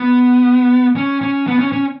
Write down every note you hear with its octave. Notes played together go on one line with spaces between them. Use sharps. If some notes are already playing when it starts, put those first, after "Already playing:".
Already playing: B3
C#4
C#4
B3
C#4
C#4